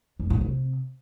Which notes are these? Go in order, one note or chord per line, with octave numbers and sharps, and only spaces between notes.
F2
A2
C3